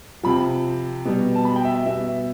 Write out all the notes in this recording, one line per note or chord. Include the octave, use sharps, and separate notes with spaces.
C3 F3 B5
B2 G3
A5
B5
G5
E5
E5
B2 G3 E5